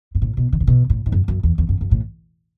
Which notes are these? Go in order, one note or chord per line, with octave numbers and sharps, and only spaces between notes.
G#2
A2
B2
D#3
C#3
B2
A2
G#2
F#2
F#2
E2
E2
F#2
F#2
A2